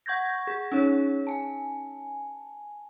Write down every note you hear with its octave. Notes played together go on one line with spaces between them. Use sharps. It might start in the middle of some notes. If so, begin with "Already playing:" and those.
F#5 C#6 G6 G#6 A#6
G#4
C#4 D#4 G#4 C#5
G#5 A5